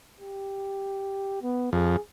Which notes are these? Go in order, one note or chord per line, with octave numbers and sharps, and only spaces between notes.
G4
B3
F2 G#4